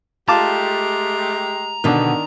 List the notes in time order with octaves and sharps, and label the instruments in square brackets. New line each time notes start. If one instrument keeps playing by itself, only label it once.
[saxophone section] G#3 A3 G4 [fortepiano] F4 A5 D6 [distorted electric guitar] A#5
[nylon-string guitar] B2 D3 [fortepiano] D#3 D4